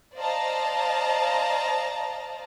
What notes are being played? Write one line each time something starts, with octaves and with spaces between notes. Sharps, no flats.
C5 D5 D#5 F5 A5 A#5